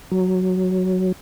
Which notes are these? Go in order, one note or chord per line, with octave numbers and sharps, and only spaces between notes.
F#3